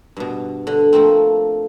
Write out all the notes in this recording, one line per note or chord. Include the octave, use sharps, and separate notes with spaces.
G2 B2
D3
F3 A3 A#3 C4